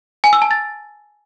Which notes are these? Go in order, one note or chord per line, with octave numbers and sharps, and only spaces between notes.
G#5
E6
A5
A6